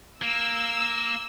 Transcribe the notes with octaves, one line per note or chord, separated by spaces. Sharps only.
A#3 E6